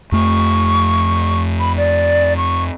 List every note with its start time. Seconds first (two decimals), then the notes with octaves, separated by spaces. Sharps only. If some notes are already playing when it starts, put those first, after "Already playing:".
0.12 F2 A3 C#6
1.60 B5
1.77 D5
2.37 C#6